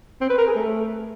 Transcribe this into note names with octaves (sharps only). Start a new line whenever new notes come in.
C4
B4
A#4
G#4
A3